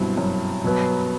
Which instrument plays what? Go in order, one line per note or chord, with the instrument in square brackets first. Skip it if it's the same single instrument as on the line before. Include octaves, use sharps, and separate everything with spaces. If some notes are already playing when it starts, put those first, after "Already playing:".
Already playing: [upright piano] G2 [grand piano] B2 F#3 C4 E4
[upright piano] F#2
[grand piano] B2 F#3 B3